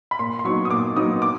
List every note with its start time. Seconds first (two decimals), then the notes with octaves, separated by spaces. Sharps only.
0.11 B5
0.19 A#2 C6
0.39 C6
0.45 F#3 B3 D#4 C#6
0.65 D#6
0.70 A#2 D6
0.96 F#3 B3 D#4 D#6
1.22 D6